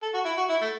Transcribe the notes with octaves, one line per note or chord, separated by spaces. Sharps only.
A4
F#4
E4
F#4
E4
A3